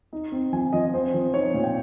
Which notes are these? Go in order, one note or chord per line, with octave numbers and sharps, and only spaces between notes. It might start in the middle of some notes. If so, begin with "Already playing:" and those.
D#4
C4
F3 G#5
F3 D#5
C4 C5
F3
D#4 C#5
A#2
G5